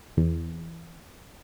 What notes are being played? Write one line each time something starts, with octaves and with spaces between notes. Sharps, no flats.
E2